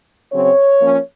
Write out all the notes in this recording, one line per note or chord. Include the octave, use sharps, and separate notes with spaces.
C#3 F#3 C4 C#5
F3 A#3 C#4